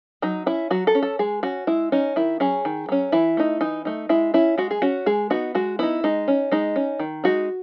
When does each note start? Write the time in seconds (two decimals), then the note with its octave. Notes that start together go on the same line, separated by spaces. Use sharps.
0.22 F#3 D#4
0.46 C#4 E4
0.71 F#3 F#4
0.87 A4
0.95 C#4
1.03 A4
1.19 G#3 G#4
1.43 C#4 F#4
1.67 G#3 E4
1.92 C#4 D#4
2.16 D#3 E4
2.40 F#3 C#4 G#4
2.65 D#3
2.89 F#3 C#4
3.12 E3 E4
3.37 A3 D#4
3.61 E3 D#4
3.85 A3 D#4
4.09 G#3 E4
4.34 C#4 E4
4.58 G#3 F#4
4.71 G#4
4.82 C#4 F#4
5.06 G#3 G#4
5.30 B3 D#4 F#4
5.55 G#3 F#4
5.79 B3 D#4 E4
6.04 G#3 D#4
6.28 C#4
6.52 G#3 D#4
6.76 C#4
6.99 D#3
7.24 G#3 D#4 F#4